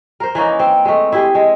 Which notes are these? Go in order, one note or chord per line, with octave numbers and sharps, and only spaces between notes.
A#4 C5
E3 A#3 C#4 D#4
C4
G#3 A3
E4 G4 G#4
G#3